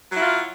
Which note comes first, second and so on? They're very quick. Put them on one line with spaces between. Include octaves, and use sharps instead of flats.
F#3 E4 F4